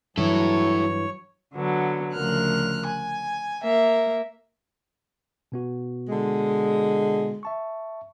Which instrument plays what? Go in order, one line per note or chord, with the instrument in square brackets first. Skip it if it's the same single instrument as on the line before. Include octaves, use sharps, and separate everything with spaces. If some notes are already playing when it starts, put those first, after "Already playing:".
[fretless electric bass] G2 E3 [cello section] F#3 [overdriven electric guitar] E4 A4 [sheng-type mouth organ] C#5
[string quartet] D3 F#3 B3
D2 C#3 F3 A#4 F6 F#6
G#5
A#3 A#4 E5
[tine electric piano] B2 B3 F#4
[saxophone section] D3 G#3
[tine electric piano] E5 A5 C#6